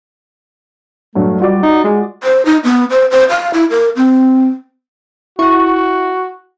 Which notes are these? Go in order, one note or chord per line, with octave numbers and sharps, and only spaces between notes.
G2 F#3 A3
G3 F4 F#4 D5
D#4
G#3
C5
D#4
B3
C5
C5
F5
E4
A#4
C4
E4 F#4 F#5 C#6